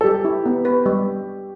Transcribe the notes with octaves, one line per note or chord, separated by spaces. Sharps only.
A4
G3 G4
E4
B3
B4
G3